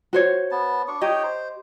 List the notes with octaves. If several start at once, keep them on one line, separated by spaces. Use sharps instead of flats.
F#4 C5 C#5
B3 A5
D4 C#6
D#4 G4 C#5 D#5 G5
C5